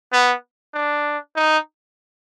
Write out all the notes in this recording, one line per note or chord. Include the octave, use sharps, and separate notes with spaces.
B3
D4
D#4